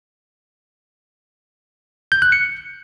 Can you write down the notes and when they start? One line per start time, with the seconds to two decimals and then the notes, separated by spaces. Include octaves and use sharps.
2.12 G6
2.22 F#6
2.32 C#7